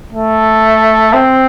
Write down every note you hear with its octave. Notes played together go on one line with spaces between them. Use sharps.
A3
C4